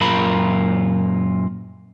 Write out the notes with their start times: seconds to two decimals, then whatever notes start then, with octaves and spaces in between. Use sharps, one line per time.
0.01 F#2 A#2 F4 A#4 B5